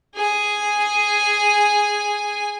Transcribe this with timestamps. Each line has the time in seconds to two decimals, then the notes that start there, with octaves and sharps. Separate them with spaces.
0.15 G#4 G#5